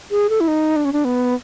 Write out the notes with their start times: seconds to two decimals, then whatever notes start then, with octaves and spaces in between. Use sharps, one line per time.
0.11 G#4
0.30 A4
0.40 E4
0.48 D#4
0.76 D4
0.85 C#4
0.93 D4
1.05 B3